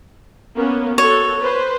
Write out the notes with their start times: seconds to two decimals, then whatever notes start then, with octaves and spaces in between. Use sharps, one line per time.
0.56 A#3 B3 C#4
0.98 F#4 A4 C#5
1.41 B4 C5